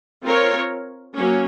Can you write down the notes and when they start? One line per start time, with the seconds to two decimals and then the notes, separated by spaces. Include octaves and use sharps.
0.22 C4 F4 A#4 C#5
1.15 F#3 A#3 C#4